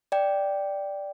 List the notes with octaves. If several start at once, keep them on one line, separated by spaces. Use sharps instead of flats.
D5 G5